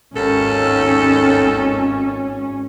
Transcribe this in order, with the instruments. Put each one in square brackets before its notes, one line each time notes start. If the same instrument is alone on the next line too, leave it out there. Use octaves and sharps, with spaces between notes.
[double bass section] G#1 C#4 [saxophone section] D#2 A4